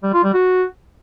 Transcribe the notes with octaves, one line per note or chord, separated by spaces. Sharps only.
G3
F4
G3
F#4